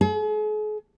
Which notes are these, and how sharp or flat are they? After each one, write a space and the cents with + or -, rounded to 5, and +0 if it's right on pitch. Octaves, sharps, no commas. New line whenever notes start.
G#4 +45